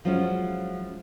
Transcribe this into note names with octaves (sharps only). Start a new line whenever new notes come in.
F3 F#3 G#3 C#4 E4 F4